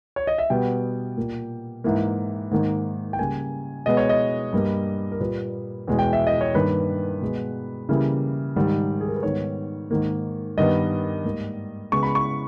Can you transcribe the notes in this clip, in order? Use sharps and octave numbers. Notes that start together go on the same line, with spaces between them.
C#5
D#5
E5
B2 G3 B3 G5
A#2 A#3
G#2 E3 A#3
G#2 D#3 A#3
G5
C#3 G3 A#3 G#5
B2 G#3 B3 D#5
C#5
D#5
G2 G3 A#3
A#4
A#2 G3 A#3 B4
E2 B2 G#3
G5
E5
D#5
C#5
G2 D#3 A#3 B4
B2 G#3 B3
C#3 E3 G3 A#3
G#2 D#3 G3
G#4
A#4
B4
G#2 D#3 G3 B3 C#5
G#2 D#3 A#3
G2 D#3 G3 B3 D#5
G#2 G3 A#3
C#3 G#3 B3 C#6
B5
C#6